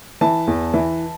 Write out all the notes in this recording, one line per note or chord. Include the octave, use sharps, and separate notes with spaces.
E3 A5
E2
E3